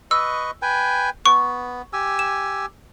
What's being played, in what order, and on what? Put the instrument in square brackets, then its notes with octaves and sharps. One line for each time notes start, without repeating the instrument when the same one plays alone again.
[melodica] B4 D#5 C#6 [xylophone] E6
[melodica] B4 G5 G#5
[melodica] B3 [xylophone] C#6
[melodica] G4 G#5 E6
[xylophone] E7